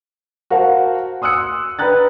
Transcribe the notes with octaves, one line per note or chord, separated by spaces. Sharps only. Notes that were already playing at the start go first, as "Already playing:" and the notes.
F#4 A#4 C5 F5 F#5 A5
C6 D#6 E6 F#6 C#7
B4 D5 G5 A#5 F#6 A6